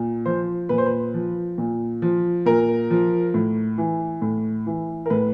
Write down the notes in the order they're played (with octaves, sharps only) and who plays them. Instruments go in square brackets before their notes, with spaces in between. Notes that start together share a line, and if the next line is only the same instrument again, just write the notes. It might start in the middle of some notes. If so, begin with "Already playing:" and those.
Already playing: [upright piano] A#2
F3 C5
A#2 B4
C5
B4
F3
A#2
F3
A#2 A#4
F3
A2
E3
A2
E3
A#4
A2 B4